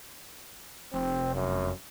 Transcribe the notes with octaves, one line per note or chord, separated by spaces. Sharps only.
F1 C4
F#2